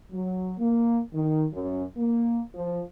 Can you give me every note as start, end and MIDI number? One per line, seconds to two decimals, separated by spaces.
0.11 0.53 54
0.59 0.99 58
1.14 1.46 51
1.53 1.83 42
1.97 2.40 58
2.53 2.81 53